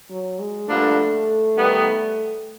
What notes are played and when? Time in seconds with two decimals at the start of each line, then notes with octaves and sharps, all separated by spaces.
0.10 F#3
0.40 G#3
0.69 G2 D3 F3 A3 A#3 D4
1.56 D#3 G3 B3